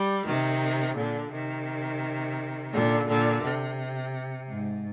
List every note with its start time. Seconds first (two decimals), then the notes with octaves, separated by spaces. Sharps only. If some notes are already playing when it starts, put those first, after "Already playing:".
Already playing: G3
0.26 C3 D#3
0.97 A#2 D3
1.32 C3 D#3
2.72 A#2 D3
3.08 A#2 D3
3.43 C3
4.49 G#2